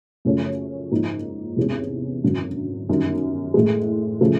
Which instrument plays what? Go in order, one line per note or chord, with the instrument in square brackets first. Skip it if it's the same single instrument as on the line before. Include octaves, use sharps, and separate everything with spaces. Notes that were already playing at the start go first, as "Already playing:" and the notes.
[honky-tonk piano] F#2 C#3 F3 A3 C#4
G#2 F3 A#3 D#4
E2 C3 E3 G#3 C#4
G#1 F#2 D3 F#3
G1 F#2 D#3 G3
A2 E3 G#3
C#3 F3 A3